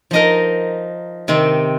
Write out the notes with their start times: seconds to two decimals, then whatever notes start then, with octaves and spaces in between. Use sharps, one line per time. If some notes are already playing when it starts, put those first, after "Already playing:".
0.11 F3 D#4 A#4 D#5
1.28 C3 D#3 C4